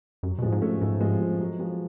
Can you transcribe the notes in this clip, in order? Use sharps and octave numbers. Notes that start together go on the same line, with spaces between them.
F#2 F#3
B2
A2 F3 G#3
G#2
A3 C#4
G#2 F#3 A3
F3 G#3
F3
F#3
F3 G#3